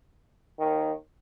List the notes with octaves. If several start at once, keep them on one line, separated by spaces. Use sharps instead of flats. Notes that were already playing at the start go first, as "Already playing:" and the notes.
D#2 D#3